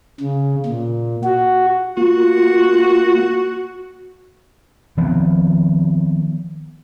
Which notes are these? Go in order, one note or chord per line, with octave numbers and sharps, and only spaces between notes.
C#3
A#2
F#4
A#3 F4 F#4
D#3 F3 B3 C4